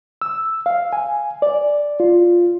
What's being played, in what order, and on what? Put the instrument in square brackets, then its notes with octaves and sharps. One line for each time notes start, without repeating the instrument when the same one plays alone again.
[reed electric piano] E6
F5
G#5
D5
F4